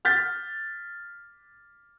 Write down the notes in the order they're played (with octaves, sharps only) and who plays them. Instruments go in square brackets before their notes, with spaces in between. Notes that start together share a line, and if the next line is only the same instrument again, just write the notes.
[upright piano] F6 G6 A6 B6